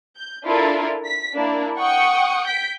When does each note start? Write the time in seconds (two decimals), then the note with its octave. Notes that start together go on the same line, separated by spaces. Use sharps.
0.15 G6
0.46 D4 E4 F4 A4 A#4
1.05 B6
1.34 A#3 D4 E4
1.79 F#5 G5 C#6 D#6 C#7
2.46 G6 B6 D7